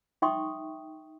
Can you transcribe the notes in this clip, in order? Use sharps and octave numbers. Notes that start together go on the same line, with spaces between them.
D#4 E5 G5 C6 C#6 D#6